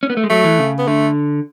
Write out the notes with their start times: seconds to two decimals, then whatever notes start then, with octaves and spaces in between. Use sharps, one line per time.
0.03 C#4
0.10 B3
0.17 A3
0.24 G#3
0.30 F#3 A3
0.44 E3
0.59 C#3
0.78 B3
0.87 D3 A3